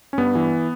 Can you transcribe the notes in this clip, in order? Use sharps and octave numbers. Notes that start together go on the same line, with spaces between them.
C#4
G2 B3
E3